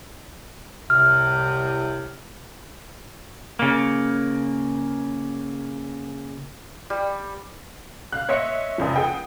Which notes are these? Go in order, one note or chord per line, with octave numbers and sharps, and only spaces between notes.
C2 A2 C3 F6
C#3 A#3
G3
F5 F#6
C#5 D#5 E5 C6 C#7
F1 C#2 F3
G#4 F#5 G5